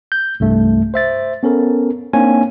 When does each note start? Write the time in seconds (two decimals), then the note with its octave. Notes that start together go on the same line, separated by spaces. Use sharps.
0.12 G6
0.40 C2 G2 A3
0.94 C5 E5 A6
1.43 B3 C#4 A4 A#4
2.13 A#3 C4 D4 D#4 C#5 G#5